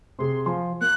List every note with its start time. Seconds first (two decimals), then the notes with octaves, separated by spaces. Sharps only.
0.19 C3 G#4 C6
0.46 F3 G#5 C6
0.81 A#3 F#6